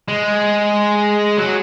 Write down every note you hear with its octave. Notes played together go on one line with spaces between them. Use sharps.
G#3
F#3